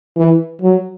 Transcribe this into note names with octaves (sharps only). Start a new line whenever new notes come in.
E3
F#3